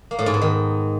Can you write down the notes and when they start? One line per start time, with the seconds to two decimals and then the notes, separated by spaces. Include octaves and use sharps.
0.11 A#3
0.19 A2
0.26 G#2
0.34 B3
0.42 D#3